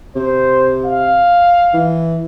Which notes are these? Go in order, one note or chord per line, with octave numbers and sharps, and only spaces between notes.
C3 C5
F5
E3